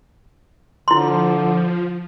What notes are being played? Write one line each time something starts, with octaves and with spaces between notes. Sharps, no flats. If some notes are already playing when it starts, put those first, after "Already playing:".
D3 F3 E4 C6